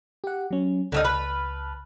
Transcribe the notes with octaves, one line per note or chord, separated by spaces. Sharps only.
G4 F#5
F#3 C#4
C#2 D3 A3 D#4 A5 F6
B4